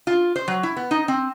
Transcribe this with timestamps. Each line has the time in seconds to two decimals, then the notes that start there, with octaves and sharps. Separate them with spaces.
0.07 F4
0.36 C5
0.48 F#3
0.63 E4
0.77 B3
0.91 D#4
1.08 C4